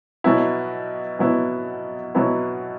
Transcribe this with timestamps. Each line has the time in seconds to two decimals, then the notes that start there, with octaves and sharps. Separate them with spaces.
0.24 B2 F#3 B3 E4
1.19 B2 F#3 B3 E4
2.15 B2 F#3 B3 E4